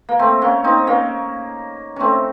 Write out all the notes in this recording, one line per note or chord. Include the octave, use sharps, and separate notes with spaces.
A#3
A3 C4
A#3 C#4
C4 D#4
A#3 C#4
A3 C4 C#4